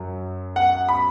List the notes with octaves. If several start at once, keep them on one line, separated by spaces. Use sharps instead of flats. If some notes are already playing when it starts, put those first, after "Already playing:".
Already playing: F#2 F#3
F#5
B5